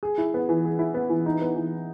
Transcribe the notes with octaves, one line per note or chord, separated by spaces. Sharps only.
G#4
E4
B3
E3
G#4
E4
B3
E3
D#4
B3
E3